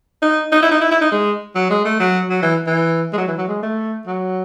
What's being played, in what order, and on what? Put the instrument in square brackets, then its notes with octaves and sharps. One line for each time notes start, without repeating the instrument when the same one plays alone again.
[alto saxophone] D#4
D#4
E4
D#4
E4
E4
D#4
G#3
F#3
G#3
A3
F#3
F#3
E3
E3
G#3
F#3
E3
F#3
G#3
A3
F#3